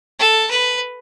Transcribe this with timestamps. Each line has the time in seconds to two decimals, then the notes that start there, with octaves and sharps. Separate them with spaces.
0.19 A4
0.50 B4